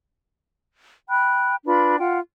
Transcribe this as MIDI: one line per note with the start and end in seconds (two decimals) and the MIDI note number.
1.09 1.56 79
1.09 1.56 83
1.09 1.56 90
1.66 1.96 62
1.66 1.96 65
1.66 1.96 71
1.66 1.96 83
1.98 2.19 65
1.98 2.19 78
1.98 2.19 79